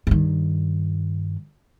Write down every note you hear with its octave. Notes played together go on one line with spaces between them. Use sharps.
G2 D#3